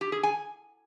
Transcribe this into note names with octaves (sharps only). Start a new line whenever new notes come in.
G4
G#4
G#5